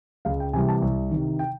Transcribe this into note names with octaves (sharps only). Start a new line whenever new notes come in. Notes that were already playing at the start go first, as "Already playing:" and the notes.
C#2 F5
G5
C3 E3 G3 G#5
A5
C2
C3 D#3
G5